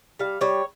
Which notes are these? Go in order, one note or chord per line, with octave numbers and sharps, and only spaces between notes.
G3 F5
G3 C#5